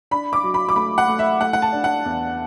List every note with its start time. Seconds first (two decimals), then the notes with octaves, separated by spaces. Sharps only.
0.11 D4 B5
0.33 D6
0.43 F#3
0.54 B5
0.69 D6
0.76 A3 B5
0.98 F#5
1.08 A3
1.19 E5
1.40 A3 F#5
1.53 F#5
1.62 A5
1.72 D4
1.84 F#5
2.05 E2